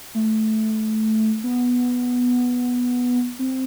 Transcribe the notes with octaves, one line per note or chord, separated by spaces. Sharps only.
A3
B3
C4